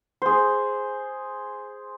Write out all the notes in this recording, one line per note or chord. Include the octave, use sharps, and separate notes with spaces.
G#4 C5